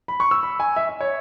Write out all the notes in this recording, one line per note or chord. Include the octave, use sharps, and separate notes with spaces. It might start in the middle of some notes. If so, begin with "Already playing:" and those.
B5
C#6
E6
B5
G#5
E5
E5
C#5